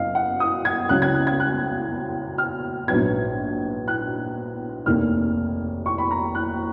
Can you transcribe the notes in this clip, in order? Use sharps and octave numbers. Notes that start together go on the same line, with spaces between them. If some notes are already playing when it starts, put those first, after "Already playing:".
Already playing: F#1 F#2 D#5 F5
F#5
D#6
G#6
C#2 C#3 F#3 C#4 F#6
G#6
F#6
G#6
F#6
F6
A#1 G#2 F#3 B3 G#6
F#6
F1 D#2 D#3 A#3 F6
C#6
B5
A#5
F#6